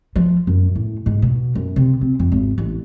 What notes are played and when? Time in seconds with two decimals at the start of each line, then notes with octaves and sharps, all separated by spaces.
0.16 F3
0.47 F#2
0.75 A2
1.06 G#2
1.22 B2
1.55 F#2
1.76 C3
2.01 C4
2.20 F2
2.32 G#1
2.58 A1